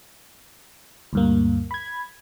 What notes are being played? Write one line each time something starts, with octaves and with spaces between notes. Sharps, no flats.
D2 G2 A#3
B5 G#6